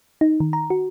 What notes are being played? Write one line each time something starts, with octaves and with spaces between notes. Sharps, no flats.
D#4
D#3
A#5
F#4